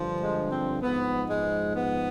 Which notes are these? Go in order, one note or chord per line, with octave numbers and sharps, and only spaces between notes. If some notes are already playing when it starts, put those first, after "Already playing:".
Already playing: G2 D3 F3
G#3
C4
G#2 F3 B3
G#3
B3